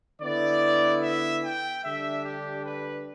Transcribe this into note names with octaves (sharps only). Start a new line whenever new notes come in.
D3 B3 E4 D5
E5
G5
D3 G3 D4 E5
G4
B4